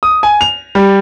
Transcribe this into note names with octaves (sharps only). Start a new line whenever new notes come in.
D#6
G#5
F7
G3